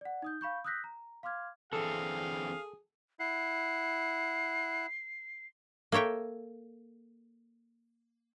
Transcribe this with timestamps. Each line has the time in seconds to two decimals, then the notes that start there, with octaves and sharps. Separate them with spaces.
0.01 D5 F#5
0.22 D#4 D#6 G6
0.41 F5 B5 C#6 G6
0.65 D#6 E6 F#6 G6 A#6 B6
0.84 A#5
1.23 F5 C6 D6 F6 G#6
1.73 D3 E3 C4 G#4 A4 F5
3.20 E4 F#5 C7
5.92 A#3 A4 C#5 E5 G5